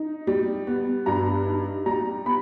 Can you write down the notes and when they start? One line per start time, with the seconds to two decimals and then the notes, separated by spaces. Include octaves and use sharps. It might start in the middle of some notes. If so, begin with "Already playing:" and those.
Already playing: D#4
0.27 G3
0.67 B3
1.06 G2 A#5
1.46 D#4
1.86 G3 A#5
2.25 B3 B5